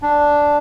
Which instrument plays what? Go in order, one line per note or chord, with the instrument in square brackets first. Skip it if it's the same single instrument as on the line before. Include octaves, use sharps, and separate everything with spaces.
[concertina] D4